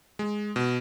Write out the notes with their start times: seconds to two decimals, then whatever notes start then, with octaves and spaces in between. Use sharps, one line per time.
0.19 G#3
0.56 B2